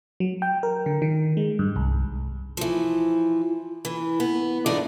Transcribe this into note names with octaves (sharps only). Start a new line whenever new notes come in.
F#3
G5
A#4
D3
D#3
G#3
G2
C2
E3 F3
E3
B3
G#2 E3 D4 G#4 D5 D#5